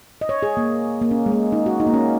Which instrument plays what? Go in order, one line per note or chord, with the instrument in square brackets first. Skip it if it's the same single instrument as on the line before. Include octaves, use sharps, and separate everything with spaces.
[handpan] D#5
C#5
G#4
A#3
A#3
C#4
G#3
A#3
D#4
F#4
D#4
A#3
C#4